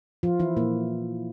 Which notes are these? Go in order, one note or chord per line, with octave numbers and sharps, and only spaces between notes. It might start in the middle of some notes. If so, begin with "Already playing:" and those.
F3 F4
E3 E4
A#2 A#3